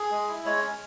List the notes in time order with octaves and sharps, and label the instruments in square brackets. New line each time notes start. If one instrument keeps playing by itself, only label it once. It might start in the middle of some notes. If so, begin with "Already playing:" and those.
Already playing: [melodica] G#4
G#3
E4
G#3 C#5
C#4